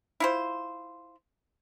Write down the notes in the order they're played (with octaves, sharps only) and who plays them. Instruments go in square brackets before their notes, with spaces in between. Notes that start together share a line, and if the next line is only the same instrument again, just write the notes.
[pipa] E4 F4 C5